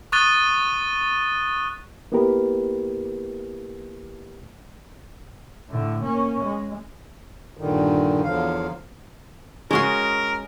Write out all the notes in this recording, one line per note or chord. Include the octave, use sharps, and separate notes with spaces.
C#6 D#6 F#6 A6 D#7 G7
A#3 B3 E4 G4 A#4 B4
A2 D3
A#3 C#4
G#3
G2 A#2 D3 D#3
E2 D3 F3 F#3 F5
G#3 C#4 F#4 A#4 D#5 C6